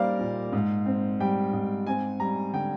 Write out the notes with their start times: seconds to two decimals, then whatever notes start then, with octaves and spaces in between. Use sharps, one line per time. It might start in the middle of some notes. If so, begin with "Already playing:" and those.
Already playing: G3 A#3 D#4 A#4 C5 D5 F5
0.19 A#2
0.53 G#2
0.86 C4
1.20 G3 G5
1.53 G#2
1.87 C4 G#5
2.20 G3 A#5
2.53 D3 G5